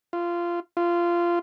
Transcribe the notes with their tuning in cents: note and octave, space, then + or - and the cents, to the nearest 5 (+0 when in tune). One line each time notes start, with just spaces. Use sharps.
F4 -15
F4 -15